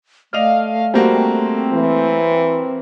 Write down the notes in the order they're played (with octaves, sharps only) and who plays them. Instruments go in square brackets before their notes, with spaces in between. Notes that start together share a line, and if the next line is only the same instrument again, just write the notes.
[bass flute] A3 [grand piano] D5 D#5 F7 [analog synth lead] F5
[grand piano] G3 A#3 F#4 [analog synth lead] C4
[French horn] E3